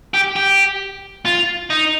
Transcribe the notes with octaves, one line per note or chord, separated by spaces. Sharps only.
G4
G4
F4
D#4